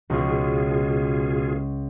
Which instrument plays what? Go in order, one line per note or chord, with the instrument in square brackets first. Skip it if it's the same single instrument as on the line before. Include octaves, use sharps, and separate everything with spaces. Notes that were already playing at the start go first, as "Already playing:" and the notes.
[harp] C#2 [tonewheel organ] B2 F4 G#4